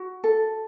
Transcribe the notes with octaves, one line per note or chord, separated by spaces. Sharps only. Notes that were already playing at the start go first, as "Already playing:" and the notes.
Already playing: F#4
A4